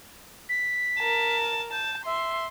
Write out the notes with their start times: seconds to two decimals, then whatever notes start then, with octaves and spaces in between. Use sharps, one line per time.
0.49 B6
0.99 A#4 A5
1.72 A5 G6
2.06 E5 C6